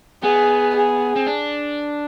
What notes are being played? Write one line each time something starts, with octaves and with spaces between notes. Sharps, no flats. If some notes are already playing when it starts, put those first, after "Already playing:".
B3 G#4
G#4
C4
D4